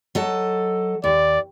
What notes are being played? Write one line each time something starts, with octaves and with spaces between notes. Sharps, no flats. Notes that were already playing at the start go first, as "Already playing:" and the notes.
F#3 A4 D#5
D#2 D5